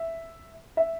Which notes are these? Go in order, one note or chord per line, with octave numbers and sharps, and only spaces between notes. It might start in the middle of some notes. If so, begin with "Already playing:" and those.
Already playing: E5
E5